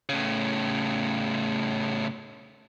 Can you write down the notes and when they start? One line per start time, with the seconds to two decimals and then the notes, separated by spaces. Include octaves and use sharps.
0.09 A2 C#3